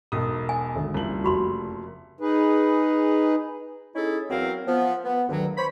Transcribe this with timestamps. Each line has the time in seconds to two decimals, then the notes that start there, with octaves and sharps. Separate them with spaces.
0.12 E1 B1 D#6
0.49 G#5
0.75 G#1 D3 E5
0.94 F#1 C2 F3 F#7
1.24 F1 F#4 B5 C6
2.20 D#4 G#4 B4
3.95 C#4 D#4 E4 G#4 A4
4.29 E2 F#3 C4 A#4 F5
4.67 F3 B3
5.05 B3
5.29 D2 G2 D#3 F#3
5.57 C5 C#5 B5